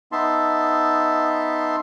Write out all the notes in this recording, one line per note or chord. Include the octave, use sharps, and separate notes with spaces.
B3 D#4 E5 A5 C6